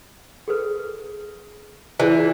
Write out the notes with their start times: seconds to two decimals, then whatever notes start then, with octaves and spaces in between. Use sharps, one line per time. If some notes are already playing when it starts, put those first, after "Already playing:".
0.48 G#4 A4 B4
2.00 E3 F4 G#4 D5